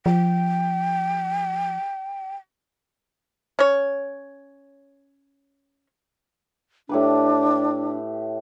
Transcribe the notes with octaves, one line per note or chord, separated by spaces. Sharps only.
F3 G5
C#4 C#5
A2 D4 G4 B4